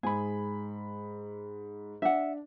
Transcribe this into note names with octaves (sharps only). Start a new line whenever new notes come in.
G#2 G#4 B5
D4 E5 F#5